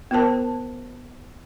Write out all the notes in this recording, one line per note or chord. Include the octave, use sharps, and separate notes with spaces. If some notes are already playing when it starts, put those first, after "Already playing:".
B3 F4 A#4 C5 A5